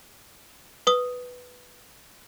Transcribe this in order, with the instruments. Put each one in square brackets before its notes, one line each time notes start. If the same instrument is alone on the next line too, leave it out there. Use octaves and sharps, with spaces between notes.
[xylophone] B4 D#6